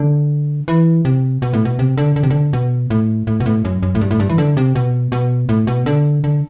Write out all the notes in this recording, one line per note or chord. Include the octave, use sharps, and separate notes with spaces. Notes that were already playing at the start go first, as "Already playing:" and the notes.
Already playing: D3
E3
C3
B2
A2
B2
C3
D3
D3
C3
D3
B2
A2
A2
B2
A2
F#2
F#2
A2
G2
A2
G2
E3
D3
C3
B2
B2
A2
B2
D3
D3